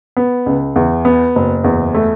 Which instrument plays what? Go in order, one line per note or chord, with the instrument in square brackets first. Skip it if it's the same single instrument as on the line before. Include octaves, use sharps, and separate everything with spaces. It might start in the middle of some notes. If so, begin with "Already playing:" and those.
[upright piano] B3
C#2
E2
B3
F#1
E2
A3